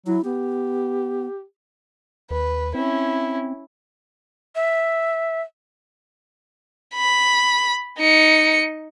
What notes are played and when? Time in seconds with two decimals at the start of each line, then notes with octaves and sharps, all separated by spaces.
0.07 F#3 E4
0.24 B3 G4
2.31 D#2 B4
2.75 C4 C#4 E4
4.56 E5
6.95 B5
7.99 D#4 C#7